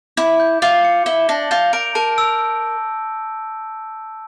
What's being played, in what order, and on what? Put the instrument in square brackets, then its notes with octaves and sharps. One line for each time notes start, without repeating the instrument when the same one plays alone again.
[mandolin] E4 [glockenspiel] D6
[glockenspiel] G6
[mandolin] F4 [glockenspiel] D6
[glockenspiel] C#7
[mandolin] E4 [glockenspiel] G7
[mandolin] D4 [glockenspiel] A#6
[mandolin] F4 [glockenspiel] G6
[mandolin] A#4 [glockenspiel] D7
[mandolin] A#4 [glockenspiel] A5
[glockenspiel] E6